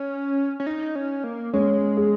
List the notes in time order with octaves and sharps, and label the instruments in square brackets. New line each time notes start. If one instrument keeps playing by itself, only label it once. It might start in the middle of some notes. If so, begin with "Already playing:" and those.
Already playing: [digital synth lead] C#4
C#4
D#4
C#4
A#3
[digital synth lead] G#3 [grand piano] C#4
[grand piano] G#4